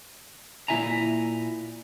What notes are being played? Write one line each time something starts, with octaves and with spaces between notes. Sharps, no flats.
A#2 A3 E4 E5 G#5 A#5